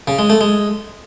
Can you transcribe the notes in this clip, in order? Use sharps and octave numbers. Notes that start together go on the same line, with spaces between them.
C#3
G#3
A3
G#3